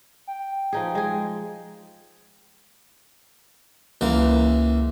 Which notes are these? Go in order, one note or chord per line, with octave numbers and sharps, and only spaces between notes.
G5
F3 D#4 G#4
G#3 G#4
C#2 E3 A#3